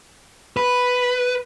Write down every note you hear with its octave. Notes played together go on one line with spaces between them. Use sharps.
B4